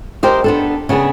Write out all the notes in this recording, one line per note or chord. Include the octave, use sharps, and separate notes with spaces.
G4 A#4 C5 D#5
B3 D4 A4
C#3 B3 D4 G#4